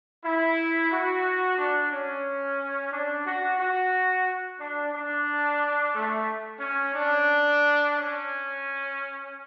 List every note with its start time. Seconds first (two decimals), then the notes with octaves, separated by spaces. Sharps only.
0.25 E4
0.91 F#4
1.58 D4
1.91 C#4
2.93 D4
3.26 F#4
3.59 F#4
4.59 D4
4.93 D4
5.94 A3
6.60 C#4
6.94 D4
7.95 C#4